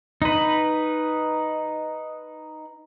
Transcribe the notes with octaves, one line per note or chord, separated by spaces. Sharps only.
D#4 B4